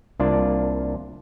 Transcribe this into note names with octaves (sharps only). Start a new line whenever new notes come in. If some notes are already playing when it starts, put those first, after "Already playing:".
C2 A#3 D4 F4 D5 A5